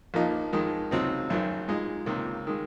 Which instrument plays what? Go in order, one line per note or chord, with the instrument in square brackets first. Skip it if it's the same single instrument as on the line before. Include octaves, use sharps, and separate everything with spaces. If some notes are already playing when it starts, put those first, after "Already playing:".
[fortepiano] A#1 A#2 F3 A#3 D#4
F2 D#3 G#3 D#4
C#2 C3 F#3 C4 D#4
G#1 F#2 D#3 F#3
A#2 G#3 D#4
C#2 C3 D#3 A#3
D#3 G#3